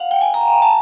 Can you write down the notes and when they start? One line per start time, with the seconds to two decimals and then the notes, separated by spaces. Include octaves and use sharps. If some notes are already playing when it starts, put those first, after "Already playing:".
Already playing: F5 F#5
0.11 G5
0.21 G#5
0.34 A#5
0.62 A5